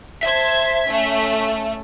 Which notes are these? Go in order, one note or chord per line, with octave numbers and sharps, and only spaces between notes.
C5 E5 A5 G#6
A3 C#4